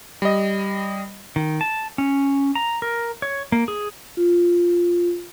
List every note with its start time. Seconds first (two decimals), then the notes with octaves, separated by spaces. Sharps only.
0.22 G3 D#5
1.36 D#3
1.61 A5
1.98 C#4
2.55 A#5
2.82 A#4
3.22 C#5
3.52 A#3
3.68 G#4
4.17 F4